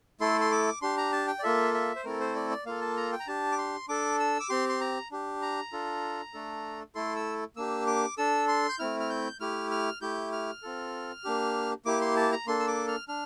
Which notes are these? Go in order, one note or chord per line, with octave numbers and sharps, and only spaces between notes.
A3 E4 A4 C6
C6
D6
D4 G4 C6
A#5
A5
G5
D5
A#3 F4 A4 E5
E5
C5
A3 C4 E4 A4 A#4
C5
D5
D5
A#3 F4 A4 F5
A5
A#5
G5
A#5
D4 G4 A5
D6
C6
D4 A4 D6
E6
D6
C4 G4 C6
C6
A#5
D4 G4
A#5
D4 F4 A4
A3 D4 A4
A3 E4 A4 C6
E6
A#3 D4 G4 E6
D6
D4 A4 E6
C6
G6
A3 C4 E4 F6
F6
G6
A3 E4 G4 F6
F6
A3 E4 G4 G6
F6
C4 F4 A4
A#3 D4 G4
A#3 E4 G4 D6
C6
A5
A#5
A#3 D4 A4 C6
E6
D6
F6
D4 F6